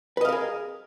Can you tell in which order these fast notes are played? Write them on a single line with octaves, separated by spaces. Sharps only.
B4 D#5 F5 A#4 G#4